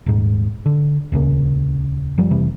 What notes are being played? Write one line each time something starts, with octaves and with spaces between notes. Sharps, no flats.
D#1 G#2
D3
D#1 C#2 C#3 A#3
F#2 F3 G3
F1 C3 E3 G3